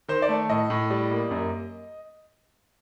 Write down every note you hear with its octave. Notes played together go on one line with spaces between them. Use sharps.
D#3 C5
D5
A3
A2 D#5
A2
G3
A#3
F#2